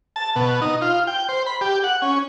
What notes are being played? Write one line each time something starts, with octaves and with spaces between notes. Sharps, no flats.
A5
B2
D#4
F4
G5
C5
B5
G4
F#5
C#4